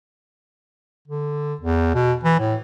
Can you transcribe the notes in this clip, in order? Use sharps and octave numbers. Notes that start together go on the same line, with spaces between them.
D3
E2
B2
E3
A2